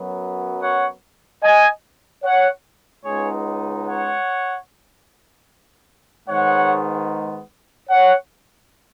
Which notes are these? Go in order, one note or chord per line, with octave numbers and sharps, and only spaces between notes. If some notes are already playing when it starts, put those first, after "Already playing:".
Already playing: F#2 F#3 B3
C#5 F#5
D#5 G#5
C#5 F#5
C#2 C#3 G#3 B3 D#4 G#4 C#5
C#5 F#5
G#2 D#3 G#3 B3 C#5 F#5
C#5 F#5